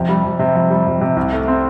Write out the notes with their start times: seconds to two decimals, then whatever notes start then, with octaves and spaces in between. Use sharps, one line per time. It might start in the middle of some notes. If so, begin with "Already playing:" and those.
Already playing: F2 C3
0.09 G3
0.24 F2
0.39 C3
0.55 F2
0.70 G3
0.87 F2
1.01 C3
1.17 C2
1.32 A3
1.48 C4